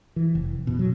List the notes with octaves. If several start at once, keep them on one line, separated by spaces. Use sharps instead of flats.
E3
F1
B2
F#3